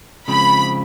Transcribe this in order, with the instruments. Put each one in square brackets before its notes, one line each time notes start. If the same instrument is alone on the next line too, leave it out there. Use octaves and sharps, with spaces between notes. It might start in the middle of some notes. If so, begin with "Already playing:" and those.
[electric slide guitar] C#3 F3 G#3 C4 [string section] B5